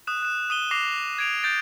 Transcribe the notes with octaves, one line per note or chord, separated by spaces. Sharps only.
D#6 F#6 E7
F#6 E7
D#6 D#7 G7
D6 A#6 C7 E7 F7
G#6 D7 F7
G6 A6 D7